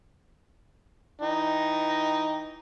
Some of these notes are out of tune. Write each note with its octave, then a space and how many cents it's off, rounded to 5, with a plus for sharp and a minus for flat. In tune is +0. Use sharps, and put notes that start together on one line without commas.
E3 +0 D#4 +0 G5 +0